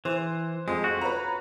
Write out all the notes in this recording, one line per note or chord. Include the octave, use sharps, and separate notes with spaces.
E3 C5
F2 G#3
F#4
B4 C#5 A#5